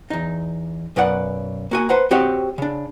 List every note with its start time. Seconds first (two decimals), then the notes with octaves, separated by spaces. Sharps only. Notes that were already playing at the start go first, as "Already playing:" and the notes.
0.10 E2 D#4
0.96 B1 F#2 B4 D5 F#5
1.71 A#3 F#4 G#5
1.89 B4 C5 F#5 A#5
2.11 C4 F#4 G4 C#5 D#5 F#5
2.58 C#3 D4